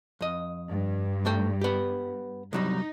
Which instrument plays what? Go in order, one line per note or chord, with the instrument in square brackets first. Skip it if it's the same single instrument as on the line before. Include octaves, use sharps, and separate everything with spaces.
[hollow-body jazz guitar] F2 D#5
[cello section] G2
[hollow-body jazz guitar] G#2 A3 G5
B3 G4
[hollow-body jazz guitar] C2 F#3 G3 [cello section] D#4